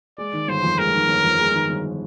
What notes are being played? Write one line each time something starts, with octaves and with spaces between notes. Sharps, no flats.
G#3 D5
D#3
G1 C5
F2
G#3 A#4
D#3
G1
F2
G#3
D#3
G1